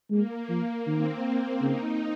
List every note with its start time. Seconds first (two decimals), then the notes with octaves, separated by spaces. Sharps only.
0.11 G#3 A#3
0.49 F3
0.86 D#3 C4
1.23 A#3
1.61 C#3 D#4